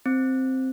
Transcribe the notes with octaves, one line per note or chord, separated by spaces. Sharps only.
C4